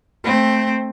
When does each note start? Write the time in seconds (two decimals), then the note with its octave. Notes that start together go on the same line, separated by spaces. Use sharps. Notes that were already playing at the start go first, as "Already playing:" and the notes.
0.24 A3 C4